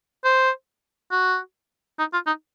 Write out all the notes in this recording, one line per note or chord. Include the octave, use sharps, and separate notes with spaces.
C5
F#4
D#4
F4
D#4